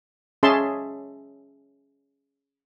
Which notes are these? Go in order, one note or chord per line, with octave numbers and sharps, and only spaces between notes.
C#4 G#4 E5 A5 C6